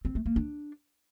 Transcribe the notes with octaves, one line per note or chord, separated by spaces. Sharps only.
C4
A3
A#3
D4